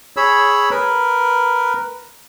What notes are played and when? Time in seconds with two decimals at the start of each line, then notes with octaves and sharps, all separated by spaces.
0.17 G#4 C#5 B5 E6
0.71 A#4 B4